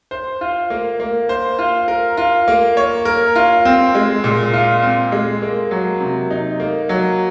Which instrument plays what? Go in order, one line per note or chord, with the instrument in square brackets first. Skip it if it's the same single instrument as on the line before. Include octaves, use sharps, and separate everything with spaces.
[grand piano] C5
F4
A#3
A#3
C5
F4
A#4
F4
A#3
C#5
A#4
F4
C4
G#3
A#2
F4
C4
G#3
A#3
F#3
C3
D#4
A#3
F#3